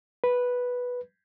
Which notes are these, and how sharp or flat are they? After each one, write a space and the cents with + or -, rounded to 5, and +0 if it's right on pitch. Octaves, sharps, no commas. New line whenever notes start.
B4 -5